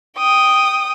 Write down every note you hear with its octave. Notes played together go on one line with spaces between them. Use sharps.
G5 D#6